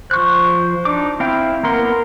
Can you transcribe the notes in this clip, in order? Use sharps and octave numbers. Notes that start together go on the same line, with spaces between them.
F3 C5 C#6 F#6
D4 D#4 D6
C4 E4 F5 G5
A#3 B3 A#4 C6